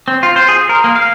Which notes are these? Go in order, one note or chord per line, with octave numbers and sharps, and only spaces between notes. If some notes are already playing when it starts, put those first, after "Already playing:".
C4
F4
C5
G#4
A#4
A#3
F5